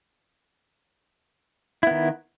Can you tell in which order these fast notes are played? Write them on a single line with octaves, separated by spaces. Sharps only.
E4 B3 D#3